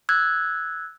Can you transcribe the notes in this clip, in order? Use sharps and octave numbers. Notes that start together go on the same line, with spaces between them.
E6 F#6 G#6